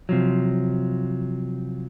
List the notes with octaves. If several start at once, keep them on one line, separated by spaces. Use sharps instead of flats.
C3 F3 F#3